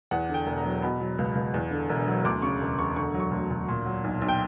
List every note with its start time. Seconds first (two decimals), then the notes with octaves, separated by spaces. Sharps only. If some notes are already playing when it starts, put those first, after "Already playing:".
0.11 E2 F#5
0.29 D3 G5
0.46 E1
0.58 A#5
0.65 F#3
0.82 B2 B5
1.01 F#3
1.19 C#2
1.35 C#2
1.54 E2
1.71 D3
1.89 E1
2.08 F#3
2.25 D2 D6
2.42 C#3 C#6
2.61 E1
2.79 E1 C#6
2.96 D3 C#6
3.14 F#3
3.20 C#6
3.32 D2
3.50 D2
3.69 A#2
3.85 F#3
4.04 B1
4.22 B1
4.29 G5